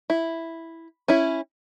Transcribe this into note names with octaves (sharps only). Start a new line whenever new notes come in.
E4
C#4 E4